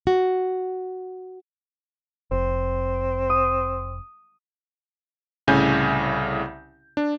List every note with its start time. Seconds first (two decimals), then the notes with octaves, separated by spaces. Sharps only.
0.07 F#4
2.31 F1 C4
3.30 D#6
5.47 C2 A2 C#3 G#5 G6
6.97 D4